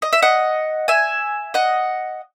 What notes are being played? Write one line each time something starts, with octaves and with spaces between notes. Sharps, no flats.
D#5
E5
D#5 F#5
E5 G#5
D#5 F#5